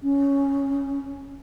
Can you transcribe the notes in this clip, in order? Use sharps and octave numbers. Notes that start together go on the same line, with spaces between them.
C#4